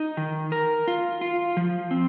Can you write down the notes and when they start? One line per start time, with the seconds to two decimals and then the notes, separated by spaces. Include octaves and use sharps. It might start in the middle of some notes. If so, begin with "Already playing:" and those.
Already playing: D#4
0.17 D#3
0.52 A#4
0.88 F4
1.21 F4
1.57 F3
1.91 C4